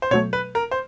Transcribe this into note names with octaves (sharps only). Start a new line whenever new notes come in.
C5
B2 F#3 A3 C#5
B4
A#4
C5